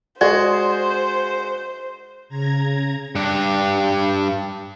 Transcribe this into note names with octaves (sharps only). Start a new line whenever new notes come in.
G#3 F#4 G#4 C5 D5
C#3 A#5 G#6 A#6
G2 D4